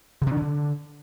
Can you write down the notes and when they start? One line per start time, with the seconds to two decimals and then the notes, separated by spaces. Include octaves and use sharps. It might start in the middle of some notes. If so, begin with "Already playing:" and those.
0.21 D3
0.26 C3
0.31 D4
0.37 D#3
0.42 D3